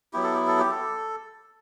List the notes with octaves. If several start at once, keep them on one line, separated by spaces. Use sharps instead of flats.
F#3 B3 E4 G4
A4
G4
A4
G4
A4